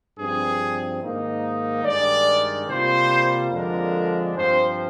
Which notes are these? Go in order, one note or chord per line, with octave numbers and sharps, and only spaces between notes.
G2 F3 C4 G#4
G#2 D#3 A#3 D#4
G2 D#3 G#3 D5
C3 G3 A#3 F4 C5
F2 D3 F3 G#3 D4 A#4
G2 F3 C4 C5